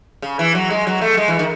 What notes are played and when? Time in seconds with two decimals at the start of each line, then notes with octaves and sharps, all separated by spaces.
0.22 C#3
0.39 E3
0.55 F#3
0.70 G#3
0.87 F#3
1.01 A3
1.17 G#3
1.28 E3
1.39 D#3